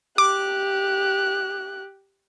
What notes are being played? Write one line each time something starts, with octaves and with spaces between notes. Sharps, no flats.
G4 D6 F#6